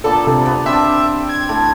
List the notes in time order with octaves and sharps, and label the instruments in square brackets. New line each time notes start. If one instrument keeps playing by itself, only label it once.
[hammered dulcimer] A#2 B3 D4 [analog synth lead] A4
[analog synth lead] C3
[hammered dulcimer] B3
[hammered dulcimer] C4 D4 G4 [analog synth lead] E5
[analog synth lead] G#6
[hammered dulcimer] A2